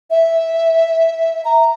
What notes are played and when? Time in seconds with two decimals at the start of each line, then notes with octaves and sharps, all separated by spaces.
0.11 E5
1.45 A#5